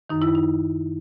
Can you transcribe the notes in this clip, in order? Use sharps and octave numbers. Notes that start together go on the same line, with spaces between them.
F#2 D#3 D#4
E4
D#4